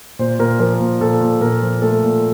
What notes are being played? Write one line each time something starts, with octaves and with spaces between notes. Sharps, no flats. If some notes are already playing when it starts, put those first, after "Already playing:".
A#2 C5
A#2 A#4
F3 A#4
A#2
A#2 A4
A#2
A#2 A#4
F3
A3 A4
A#2